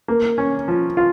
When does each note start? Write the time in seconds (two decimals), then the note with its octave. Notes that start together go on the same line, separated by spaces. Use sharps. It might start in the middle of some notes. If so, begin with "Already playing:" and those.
0.08 A#3
0.38 C#4
0.68 F3
0.97 F4